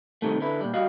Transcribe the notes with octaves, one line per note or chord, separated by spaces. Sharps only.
C2 G2 C3 D#3 A3
D3 E4 B4
A#2 G3
G3 F#4 D#5 F5